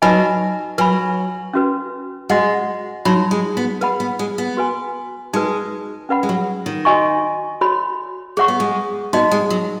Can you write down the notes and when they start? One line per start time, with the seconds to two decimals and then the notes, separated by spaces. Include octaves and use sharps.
0.02 F#3 D#4 B4 D#5 G#5 B5
0.78 F#3 B4 G#5 B5
1.54 C#4 F#4 B4
2.29 G#3 F#4 D#5 F#5
3.05 F#3 D#4 F#4 C#5 B5
3.31 G#3
3.57 B3
3.81 G#3 B4 F#5 B5
4.00 B3
4.19 G#3
4.38 B3
4.57 F#4 B4 G#5
5.33 G#3 D#4 F#4 B4
6.09 C#4 B4 F#5 B5
6.23 G#3
6.29 F#3
6.66 D#3
6.85 F#4 D#5 G#5 C#6
7.61 F#4 C#5 B5
8.37 G#3 G#4 C#5 F#5 C#6
8.48 B3
8.60 G#3
9.13 B3 D#4 F#4 D#5
9.31 G#3
9.50 F#3